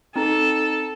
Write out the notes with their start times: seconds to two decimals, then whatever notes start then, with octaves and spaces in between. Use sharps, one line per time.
0.16 C4 D#4 A4 A#5